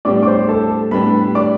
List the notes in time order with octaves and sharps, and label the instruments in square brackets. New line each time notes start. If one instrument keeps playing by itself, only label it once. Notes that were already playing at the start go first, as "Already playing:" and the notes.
[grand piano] A2 G3 B3 D4 G4 [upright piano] D5 D6
[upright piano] D6
C5 C6
A4 A5
[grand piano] A2 G3 B3 D4 G4 [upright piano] B4 B5
[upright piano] D5 D6